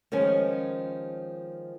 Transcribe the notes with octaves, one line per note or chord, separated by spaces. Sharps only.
D#3 F3 G#3 C#4